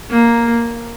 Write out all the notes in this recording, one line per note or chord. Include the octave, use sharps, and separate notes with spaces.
A#3